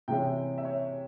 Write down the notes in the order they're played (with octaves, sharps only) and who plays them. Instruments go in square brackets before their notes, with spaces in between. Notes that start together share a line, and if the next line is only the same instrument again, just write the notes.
[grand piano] C3 E3 G#3 C#4 E4 G5
E5
C#5